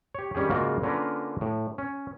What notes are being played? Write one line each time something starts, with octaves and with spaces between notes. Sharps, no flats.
G4 C#5
D#3 G3 C#4 G4 G#4
G#2 C#3 A#3 F4 F#4 D5
D3 A#3 C#4 F4 A#4 B4
A2
C#4